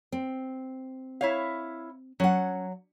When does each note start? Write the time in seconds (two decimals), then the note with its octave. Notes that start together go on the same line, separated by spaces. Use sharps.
0.12 C4
1.21 E4 C#5 F5
2.20 F#3 C#4 F#5